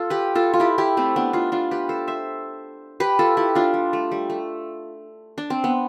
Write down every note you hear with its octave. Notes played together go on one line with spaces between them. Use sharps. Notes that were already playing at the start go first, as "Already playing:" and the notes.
Already playing: F4 A4
G4 B4
F4 A4
F4
E4 G4
E4 G4
A3 C4
B3 D4
D4 F4
D4 F4
G4 B4
A4 C5
C5 E5
G4 B4
F4 A4
E4 G4
D4 F4
G3
A3
G3
A3
D4
C4
B3